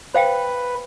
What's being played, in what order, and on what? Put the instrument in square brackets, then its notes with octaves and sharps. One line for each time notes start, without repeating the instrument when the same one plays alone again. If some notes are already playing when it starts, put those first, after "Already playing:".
[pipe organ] B4 [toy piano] C5 F5 G5